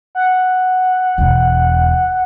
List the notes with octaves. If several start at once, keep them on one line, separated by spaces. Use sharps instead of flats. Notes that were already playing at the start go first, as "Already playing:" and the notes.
F#5
E1 E2